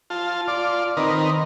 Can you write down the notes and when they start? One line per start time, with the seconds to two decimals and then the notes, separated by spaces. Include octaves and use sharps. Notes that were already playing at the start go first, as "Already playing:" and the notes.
0.10 F4 A5
0.48 F4 D5
0.97 D#3 C4 D#4 A#4 B4